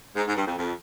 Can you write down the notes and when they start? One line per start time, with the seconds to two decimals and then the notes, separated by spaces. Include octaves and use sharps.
0.16 G#2
0.26 G#2
0.36 G2
0.46 F2
0.57 F2